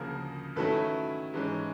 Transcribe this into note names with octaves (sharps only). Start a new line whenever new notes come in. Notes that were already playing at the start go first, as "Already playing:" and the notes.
Already playing: D2 C#3 F3 A#3 G#4 A#4
D#3 F#3 A3 C#4 E4 A4 B4
G#2 E3 G#3 C#4